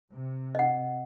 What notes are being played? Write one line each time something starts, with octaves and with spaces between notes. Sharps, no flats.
C3
D#5 F#5